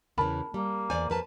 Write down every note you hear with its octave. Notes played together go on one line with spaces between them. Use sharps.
E2 C#3 E3 A#4 A5 B5
G3 A#3
E2 C5 D5 G#5
F2 A#4 B4 A5